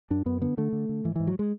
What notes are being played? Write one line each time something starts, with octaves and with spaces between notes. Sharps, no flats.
F#2 D4
F#2 B3
D3 B3
D3 A3
D3
D3
G#2 E3
G#2 E3
F#3
G#3